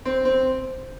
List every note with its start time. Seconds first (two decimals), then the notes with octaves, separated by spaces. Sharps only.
0.05 C4
0.25 C4